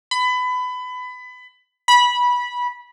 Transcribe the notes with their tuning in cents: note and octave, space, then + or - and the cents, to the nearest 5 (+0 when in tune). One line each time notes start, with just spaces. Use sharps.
B5 +25
B5 -15